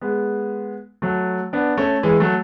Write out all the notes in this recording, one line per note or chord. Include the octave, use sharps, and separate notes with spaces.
G#3 B3
F#3 A3
B3 D4
A3 C#4
E3 G#3
F#3 A3